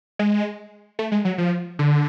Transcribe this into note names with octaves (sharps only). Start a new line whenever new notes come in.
G#3
A3
G#3
F#3
F3
D3